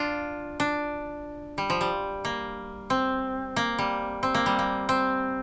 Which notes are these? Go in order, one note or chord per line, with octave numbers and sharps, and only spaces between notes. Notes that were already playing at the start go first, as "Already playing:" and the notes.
Already playing: D4 F4
D4
G3
F3
G3
A#3
C4
A#3
G3
C4
A#3
G3
A#3
C4